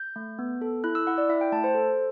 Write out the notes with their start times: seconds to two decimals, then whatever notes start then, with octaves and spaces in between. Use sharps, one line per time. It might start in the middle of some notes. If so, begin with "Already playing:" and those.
Already playing: G6
0.16 A3
0.39 B3
0.61 A4
0.84 E4 F#6
0.95 E6
1.07 E4 F#5
1.18 D5
1.29 E4 E5
1.41 G5
1.52 A3 A5
1.64 C5
1.75 A4